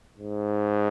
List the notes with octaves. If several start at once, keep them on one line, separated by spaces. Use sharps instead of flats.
G#2